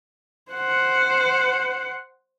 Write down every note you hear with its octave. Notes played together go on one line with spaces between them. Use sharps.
C5 F#5